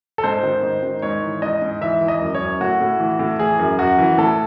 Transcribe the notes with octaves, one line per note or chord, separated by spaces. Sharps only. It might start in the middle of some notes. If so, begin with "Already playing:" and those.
A4
G#2 C5
D#3
G#2
D#3
G#2 C#5
E3
G#2 D#5
G#2
E3 E5
E3
D#5
F#2
C#5
F#2
A2 F#4
A2
E3
A2
E3 G#4
F#2
F#2 F#4
E3
A2 A4